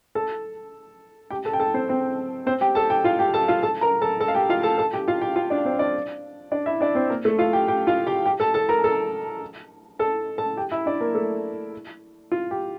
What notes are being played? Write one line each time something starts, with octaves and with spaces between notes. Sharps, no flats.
A4 A5
G4 G5
A4 A5
G5
A4 A5
C4 C5
C4 C5
C4 C5
G4 G5
A4 A5
G4 G5
F4 F5
G4 G5
A4 A5
F4 F5
A4 A5
A#4 A#5
A4 A5
A4 A5
F5
G4 G5
F4 F5
A4 A5
A4 A5
G4 G5
F4 F5
G4 G5
F4 F5
D4 D5
C4 C5
D4 D5
D4 D5
E4 E5
D4 D5
C4 C5
A#3 A#4
A3 A4
F4 F5
G4 G5
G4 G5
F4 F5
G4 G5
G4 G5
A4 A5
A4 A5
A#4 A#5
A4 A5
A4 A5
A4 A5
G4 G5
E4 E5
D4 D5
A#3 A#4
A3 A4
F4
G4